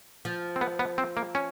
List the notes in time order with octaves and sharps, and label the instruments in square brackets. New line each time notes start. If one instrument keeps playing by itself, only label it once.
[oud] F3
[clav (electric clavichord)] C4
B3
B3
C4
A#3
C#4